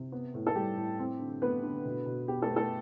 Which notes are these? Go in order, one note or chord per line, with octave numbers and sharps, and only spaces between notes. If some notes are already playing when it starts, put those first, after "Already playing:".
Already playing: C3
B3
A2
A4
G3 G4
A2
C4
D3
A3 B3 B4
D3
B2
B2
B3 G4
A3 A4
B3
A3 A4